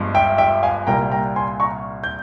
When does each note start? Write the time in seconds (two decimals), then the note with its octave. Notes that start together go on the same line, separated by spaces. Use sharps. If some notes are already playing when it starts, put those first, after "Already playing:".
Already playing: G1 G2 F3 G#3
0.14 E5 G5
0.38 E5 G5
0.63 F5 G#5
0.87 C2 A#2 G3 A#3 G5 A#5
1.12 G5 A#5
1.36 G#5 C6
1.60 A#5 C#6
2.04 G6